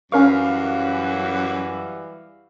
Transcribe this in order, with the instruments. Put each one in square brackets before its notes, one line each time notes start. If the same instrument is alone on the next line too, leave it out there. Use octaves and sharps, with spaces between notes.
[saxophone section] F#2 [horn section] E3 G3 F#4 [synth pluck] C#4 A#4 C#6 [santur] F5